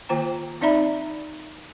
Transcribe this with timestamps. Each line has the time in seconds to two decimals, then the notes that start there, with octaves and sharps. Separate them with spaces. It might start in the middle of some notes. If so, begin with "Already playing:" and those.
0.09 D#3 A#3 F4 C5 G5 A#5
0.61 C4 D#4 D5 E5 A#5 B5